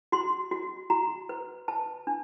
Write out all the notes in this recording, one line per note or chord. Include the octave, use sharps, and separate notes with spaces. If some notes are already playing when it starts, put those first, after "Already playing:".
F#4 C6
F#4
F#4 A#5
B4
B4 A5
D4